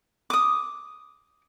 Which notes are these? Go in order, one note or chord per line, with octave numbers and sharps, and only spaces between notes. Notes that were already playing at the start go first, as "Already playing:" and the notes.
D6 D#6